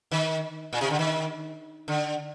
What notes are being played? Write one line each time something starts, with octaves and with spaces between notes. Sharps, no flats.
D#3
A#2
C3
D3
D#3
D3